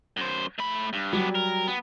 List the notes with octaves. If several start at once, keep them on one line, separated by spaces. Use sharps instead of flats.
F#2 C5
A3 B5
G2
F#3 G3 B3 D4
A#4
B3